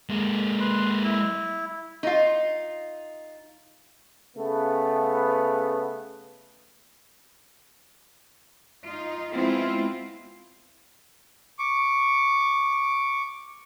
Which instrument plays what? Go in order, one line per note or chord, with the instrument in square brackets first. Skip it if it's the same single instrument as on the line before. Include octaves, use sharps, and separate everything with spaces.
[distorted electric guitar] G#3 A#3
[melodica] B4 C6
E4
[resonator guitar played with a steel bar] D#4 F4
[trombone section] C#3 A3 B3
[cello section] D#4 F4
G#3 B3 C4 E4 F4
[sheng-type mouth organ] C#6 D6